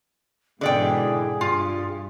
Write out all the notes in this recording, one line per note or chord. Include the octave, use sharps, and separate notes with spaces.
G#2 B2 D3 E3 G#4 D5 G5
G2 F4